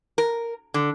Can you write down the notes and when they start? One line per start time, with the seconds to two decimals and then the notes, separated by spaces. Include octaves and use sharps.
0.18 A#4
0.74 D3